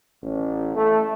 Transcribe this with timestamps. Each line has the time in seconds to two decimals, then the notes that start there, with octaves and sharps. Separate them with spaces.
0.23 A1
0.76 A3